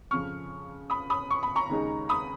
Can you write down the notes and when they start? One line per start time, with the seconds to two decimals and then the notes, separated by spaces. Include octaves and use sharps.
0.11 F2 C#3 F3 C#6 F6
0.90 B5 D#6
1.10 B5 D#6
1.31 C#6
1.43 B5
1.56 A#5 C#6
1.70 D#2 C#3 G#3 D#4
2.09 B5 D#6